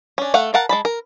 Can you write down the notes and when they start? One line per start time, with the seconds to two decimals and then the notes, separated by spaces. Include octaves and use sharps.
0.18 C#4 D4
0.34 A3 F5 F#5
0.54 A#4 F5 F#5 A5 A#5
0.69 G#3 A5 B5
0.85 A#4